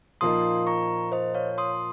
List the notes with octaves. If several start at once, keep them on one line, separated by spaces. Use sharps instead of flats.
A#2 F3 A#3 D#4 C6 D#6
A#5 C#6
C5 D#5
C#5 F5
C6 D#6